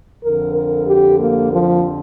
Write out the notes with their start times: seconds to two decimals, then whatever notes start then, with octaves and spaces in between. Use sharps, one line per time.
0.22 F2 D3 A#4
0.54 A#4
0.87 G4
1.19 A#3
1.51 F3